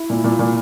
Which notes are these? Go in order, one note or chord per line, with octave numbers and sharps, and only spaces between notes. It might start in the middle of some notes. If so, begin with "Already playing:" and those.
Already playing: E4
A#2
A#2
A#2